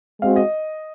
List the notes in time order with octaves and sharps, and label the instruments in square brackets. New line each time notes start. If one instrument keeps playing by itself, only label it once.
[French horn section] G#3 C4 F#4 [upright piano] F5
[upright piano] D#5